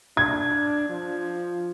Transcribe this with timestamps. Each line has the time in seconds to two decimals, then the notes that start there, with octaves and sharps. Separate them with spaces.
0.17 D4 G#6
0.89 F3